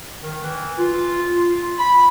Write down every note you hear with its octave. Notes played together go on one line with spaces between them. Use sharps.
D#3
E3
F4
F4
B5